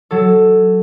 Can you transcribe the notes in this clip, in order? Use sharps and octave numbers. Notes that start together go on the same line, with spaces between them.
F#3 A4